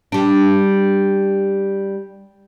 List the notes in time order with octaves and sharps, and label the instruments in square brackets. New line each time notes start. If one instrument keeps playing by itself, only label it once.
[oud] G3 D4